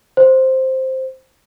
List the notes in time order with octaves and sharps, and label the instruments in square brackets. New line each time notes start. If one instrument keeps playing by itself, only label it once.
[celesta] C5